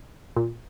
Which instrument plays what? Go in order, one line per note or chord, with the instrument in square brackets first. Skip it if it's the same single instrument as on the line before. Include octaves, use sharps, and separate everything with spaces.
[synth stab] A#2